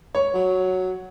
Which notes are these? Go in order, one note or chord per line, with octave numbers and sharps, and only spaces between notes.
C#5
F#3